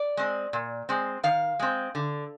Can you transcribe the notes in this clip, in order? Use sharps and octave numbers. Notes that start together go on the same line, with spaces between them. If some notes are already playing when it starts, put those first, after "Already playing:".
Already playing: D5
G#3 C4
A#2
G#3 C4
D#3 F5
G#3 C4
D3